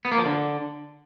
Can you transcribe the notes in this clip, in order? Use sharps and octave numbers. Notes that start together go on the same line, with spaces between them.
B3
A#3
F3
D3